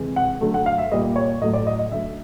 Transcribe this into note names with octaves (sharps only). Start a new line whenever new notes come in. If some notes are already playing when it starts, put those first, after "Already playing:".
Already playing: C3 E3 G#3
F#5
D3 F#3 A3
F#5
F5
E5
A#2 G3 D#5
C#5
A2 F#3 A3 D#5
D5
D#5
D#5
D3 F#3 A3 E5